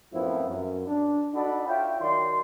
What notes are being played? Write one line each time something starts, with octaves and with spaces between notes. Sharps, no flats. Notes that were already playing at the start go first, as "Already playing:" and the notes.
F#2 A2 F3 B3 C4 E4
F#2
D4
D4 D#4 F#4 A4 B5
F4 C#5 E5 G5
D#3 F#3 D5 C6